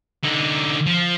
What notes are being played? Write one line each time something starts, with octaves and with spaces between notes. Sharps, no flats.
D3 D#4
F3